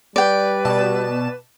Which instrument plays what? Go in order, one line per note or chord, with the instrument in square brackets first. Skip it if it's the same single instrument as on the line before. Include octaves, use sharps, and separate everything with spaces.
[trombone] G3 [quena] B4 [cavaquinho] D5 G5
[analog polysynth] B2 A5 E7